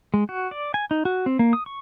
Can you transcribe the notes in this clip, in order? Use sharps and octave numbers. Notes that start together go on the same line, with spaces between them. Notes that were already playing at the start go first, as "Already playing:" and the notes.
G#3
F#4
D5
G#5
D#4
F#4
C4
A#3
D#6
C#6